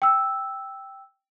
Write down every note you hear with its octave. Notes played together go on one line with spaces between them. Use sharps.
G5 E6